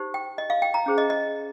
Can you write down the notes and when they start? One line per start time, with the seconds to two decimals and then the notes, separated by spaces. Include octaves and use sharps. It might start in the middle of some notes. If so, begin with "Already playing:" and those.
Already playing: D#4 G4 C5
0.14 G5
0.38 D#5
0.50 F5
0.62 G5
0.74 A#5
0.86 C#4 G#4 C5
0.98 D#5
1.10 D#5